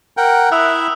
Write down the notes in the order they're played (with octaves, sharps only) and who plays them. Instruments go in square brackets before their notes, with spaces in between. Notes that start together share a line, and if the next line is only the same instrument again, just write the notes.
[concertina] A#4 F#5 G5
[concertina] E4 E5 [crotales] D#6 E6 F#6